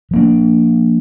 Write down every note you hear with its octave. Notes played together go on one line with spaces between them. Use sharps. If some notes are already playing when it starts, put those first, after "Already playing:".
F3 A#3 D4